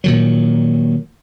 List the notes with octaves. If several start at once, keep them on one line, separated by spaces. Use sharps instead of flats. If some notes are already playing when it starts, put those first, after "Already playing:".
A#2 D#3 F#3